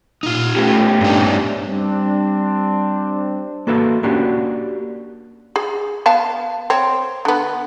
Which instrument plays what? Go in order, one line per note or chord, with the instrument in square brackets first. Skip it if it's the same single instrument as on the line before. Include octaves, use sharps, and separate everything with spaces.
[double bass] A#2 [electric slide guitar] D#4 F4
[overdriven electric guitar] A2 C#3 [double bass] A3 [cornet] G4
[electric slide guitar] G2 D#4 [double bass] D4
[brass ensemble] G3 C4 D4
[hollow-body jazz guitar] A#3 F#4 A4 B4 E5 F5
A#3 C#4 D4 F#4 G4
[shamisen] G#4
B3 F5 A5
C4 C#5
D3 B3